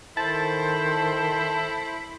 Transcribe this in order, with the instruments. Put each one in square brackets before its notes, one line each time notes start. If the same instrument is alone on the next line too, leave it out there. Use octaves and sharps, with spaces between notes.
[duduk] D#3 [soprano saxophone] E4 [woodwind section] A4 C5 [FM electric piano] A5